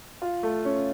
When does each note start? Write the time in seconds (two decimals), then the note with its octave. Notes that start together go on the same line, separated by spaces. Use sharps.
0.22 F4
0.43 A3
0.65 C#4